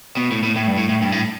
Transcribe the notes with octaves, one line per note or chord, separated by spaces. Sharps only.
B2
A2
A2
A2
G2
A2
A2
G2
A2